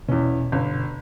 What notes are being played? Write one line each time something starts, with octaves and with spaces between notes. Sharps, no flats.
E2 B2 C#4
G1